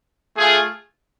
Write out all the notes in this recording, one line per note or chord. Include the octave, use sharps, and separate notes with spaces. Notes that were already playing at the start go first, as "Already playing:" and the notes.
A3 F4 G#4